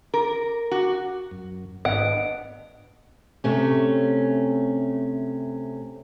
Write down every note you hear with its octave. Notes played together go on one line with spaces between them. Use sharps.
A#4
F#4
F#2
G#1 B3 D4 D#5 F#5 D7
C3 A3 C#4